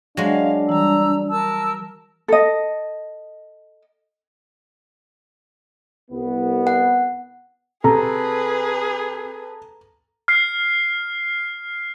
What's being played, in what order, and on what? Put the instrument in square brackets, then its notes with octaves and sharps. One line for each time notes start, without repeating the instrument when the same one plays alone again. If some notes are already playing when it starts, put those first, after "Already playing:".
[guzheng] F#3 G#3 [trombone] D4 [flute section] F5
[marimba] E3 G3 [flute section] A#5 E6
[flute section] A#4 A5 E6
[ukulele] A4 D#5
[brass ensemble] C2 B3
[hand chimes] F#5
[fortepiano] C3 [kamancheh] G#4 B4 [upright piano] A4 [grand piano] A#5
[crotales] F6 C7